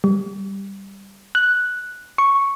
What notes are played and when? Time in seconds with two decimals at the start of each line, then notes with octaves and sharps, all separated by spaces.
0.04 G3
1.35 F#6
2.18 C#6